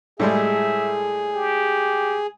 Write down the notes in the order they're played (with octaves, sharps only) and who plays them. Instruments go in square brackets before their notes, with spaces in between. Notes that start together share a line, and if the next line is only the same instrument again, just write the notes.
[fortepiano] A2 G3 G#3 [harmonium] G#4 [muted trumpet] E5
[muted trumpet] G4